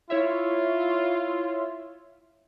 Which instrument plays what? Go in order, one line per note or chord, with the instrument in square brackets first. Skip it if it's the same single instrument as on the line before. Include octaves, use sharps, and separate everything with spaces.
[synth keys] E4 C#5 E5 [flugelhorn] F4